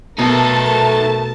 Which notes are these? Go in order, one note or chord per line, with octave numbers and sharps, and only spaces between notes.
B2 A3 D#4 A4 A#4 A5